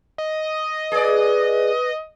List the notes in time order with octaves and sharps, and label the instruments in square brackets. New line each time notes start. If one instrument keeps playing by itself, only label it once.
[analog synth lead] D#5
[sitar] G#4 D5 [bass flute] B4